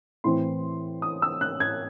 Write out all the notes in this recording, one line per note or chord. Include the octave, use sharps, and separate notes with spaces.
A2 E3 C4 C6
D#6
E6
F#6
G#6